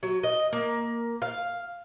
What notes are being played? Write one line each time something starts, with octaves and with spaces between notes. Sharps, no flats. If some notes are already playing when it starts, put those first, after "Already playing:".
F#3
D#5
A#3
F5